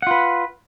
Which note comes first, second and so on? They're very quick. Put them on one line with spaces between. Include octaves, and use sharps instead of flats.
F#5 F4 B4